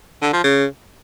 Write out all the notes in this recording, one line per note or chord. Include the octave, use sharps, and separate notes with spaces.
D3
F3
C#3